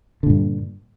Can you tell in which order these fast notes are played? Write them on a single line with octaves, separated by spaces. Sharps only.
D3 A#2 G2